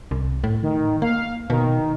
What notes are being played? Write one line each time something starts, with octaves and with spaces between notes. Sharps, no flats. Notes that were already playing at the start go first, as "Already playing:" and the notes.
C2
A2
D#3
A#3 F5
B2 D#3